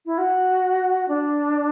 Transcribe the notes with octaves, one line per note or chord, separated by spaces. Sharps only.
E4
F#4
D4